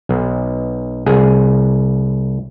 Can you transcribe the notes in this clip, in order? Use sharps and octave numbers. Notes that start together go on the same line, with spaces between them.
B1
C2 G#4